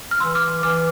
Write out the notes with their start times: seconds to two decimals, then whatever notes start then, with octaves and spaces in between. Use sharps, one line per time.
0.11 F6
0.20 E3 C6 E6
0.35 D6 F6
0.63 E3 D6 F6